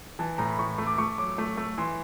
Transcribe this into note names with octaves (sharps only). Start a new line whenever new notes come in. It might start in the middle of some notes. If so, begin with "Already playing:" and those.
E3 A5
A2 A#5
B5
A2 C#6
A3
D6
A3 C#6
F#3 D6
A3
A3
E3 C6